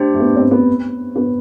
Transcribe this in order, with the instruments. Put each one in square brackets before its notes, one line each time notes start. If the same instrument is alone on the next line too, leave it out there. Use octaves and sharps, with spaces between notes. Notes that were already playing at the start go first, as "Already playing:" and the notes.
Already playing: [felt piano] A3 [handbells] D4 G4 C5
[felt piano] A3
B3
C4
B3
B3